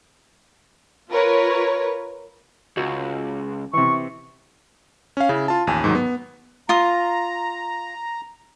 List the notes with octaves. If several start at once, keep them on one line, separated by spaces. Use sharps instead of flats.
F4 A#4 B4 C#5
C#2 F#4
C3 E3 C#6
C#4 F5
C#3 E4
F4 A5
A1 D#2 G#5 D#7
A1 G#2 D#3 F#3
B3
F4 A#5 D#6